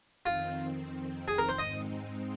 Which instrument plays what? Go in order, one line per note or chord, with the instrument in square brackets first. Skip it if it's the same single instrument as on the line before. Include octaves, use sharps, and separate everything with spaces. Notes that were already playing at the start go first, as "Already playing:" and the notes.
[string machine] F2 D#3 C4 [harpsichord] F4
[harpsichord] G#4
A#4
C5
[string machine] G#2 G#3 C4 D#4 [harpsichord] D#5